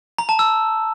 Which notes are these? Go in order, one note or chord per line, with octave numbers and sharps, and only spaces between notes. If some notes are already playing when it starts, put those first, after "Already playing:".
A#5
A5
E6